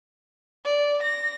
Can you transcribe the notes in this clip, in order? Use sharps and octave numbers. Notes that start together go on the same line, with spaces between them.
D5
A#6